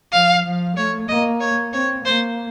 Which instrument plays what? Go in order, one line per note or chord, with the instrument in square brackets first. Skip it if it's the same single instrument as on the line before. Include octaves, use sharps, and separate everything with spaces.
[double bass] F3 [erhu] F5
[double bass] F3
[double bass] A3 [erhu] C#5
[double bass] A#3 [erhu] D#5
[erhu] C#5
[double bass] C4 [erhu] C#5
[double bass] A#3 [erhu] C5